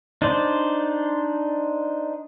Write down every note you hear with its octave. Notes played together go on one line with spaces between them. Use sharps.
D4 D#4 C5 D5